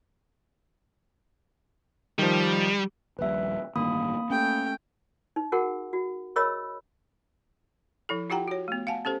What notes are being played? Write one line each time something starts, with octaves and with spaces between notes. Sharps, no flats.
D#3 F3 G3
D#1 A#1 G3 B4 E5
A1 G2 D#3 A#3 B5 D#6
A3 C#4 G5
D#4
F#4 G#4 A#4 F#5
F#4
G#4 A#4 C#5 D#5 B5 E6
F3 E4 A4
E4 F4 G4 F#5 G5 A#5
F#4 C#5
A3 B3
F5 F#5 G#5 A5
C#4 G4 A4 C5